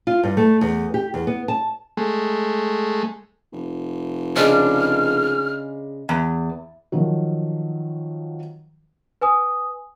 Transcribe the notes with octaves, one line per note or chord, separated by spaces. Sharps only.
F4
G2
A3
E2
G4
E2
B3
A5
G#3 A3
F1
C#3 G#3 D4 F6
E2
D#3 F3 F#3
B4 G#5 D#6